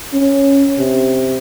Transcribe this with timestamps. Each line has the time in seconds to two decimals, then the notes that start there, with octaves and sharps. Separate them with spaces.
0.14 C#4
0.79 C3